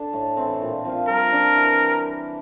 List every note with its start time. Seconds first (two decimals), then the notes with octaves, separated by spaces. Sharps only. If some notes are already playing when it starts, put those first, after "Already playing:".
Already playing: D4 A4
0.13 A2
0.37 E3 A3 C4
0.61 A#2
0.85 F3 C4 F4
1.08 G3 A#4
1.32 D4 G4
1.56 E3